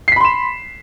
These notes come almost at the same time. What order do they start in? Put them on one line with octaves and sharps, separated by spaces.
C7 B6 B5 C6 E7